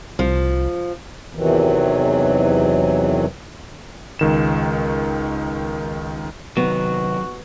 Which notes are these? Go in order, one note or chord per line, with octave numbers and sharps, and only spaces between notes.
C2 F3
E2 C3 D#3 E3 F#3
C#2 D#3 E7
C3 D#3 F#3 B3 F#4